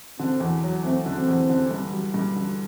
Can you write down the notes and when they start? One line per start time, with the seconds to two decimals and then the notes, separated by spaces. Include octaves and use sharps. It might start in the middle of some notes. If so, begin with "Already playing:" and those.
0.19 D3 C4
0.40 E2
0.63 F#3
0.84 A3 C4
1.06 D3
1.17 C4
1.28 E2
1.49 D3
1.71 G2
1.93 G3
2.14 G2
2.36 D3